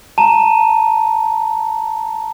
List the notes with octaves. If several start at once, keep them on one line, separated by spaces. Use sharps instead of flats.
A5 A#5